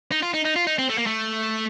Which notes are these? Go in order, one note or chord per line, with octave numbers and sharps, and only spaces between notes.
D#4
F4
D#4
D#4
F4
D#4
C4
A3
A#3
A3